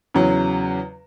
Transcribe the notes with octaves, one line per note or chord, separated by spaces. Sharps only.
E2 C#3 F#3